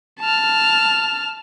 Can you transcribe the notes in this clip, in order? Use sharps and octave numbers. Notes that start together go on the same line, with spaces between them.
A5 F6